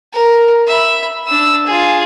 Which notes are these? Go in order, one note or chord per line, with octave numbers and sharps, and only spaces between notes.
A#4
E5 B5
D4 E6
F4 G#4